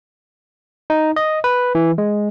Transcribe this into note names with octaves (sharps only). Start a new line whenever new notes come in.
D#4
D#5
B4
E3
G#3